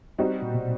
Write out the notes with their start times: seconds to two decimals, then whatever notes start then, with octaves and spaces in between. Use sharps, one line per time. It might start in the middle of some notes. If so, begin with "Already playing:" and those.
0.18 G3 C4 D#4 F#4
0.42 A#2
0.54 B2